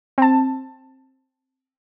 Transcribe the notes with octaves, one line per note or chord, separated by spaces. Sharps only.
C4 A5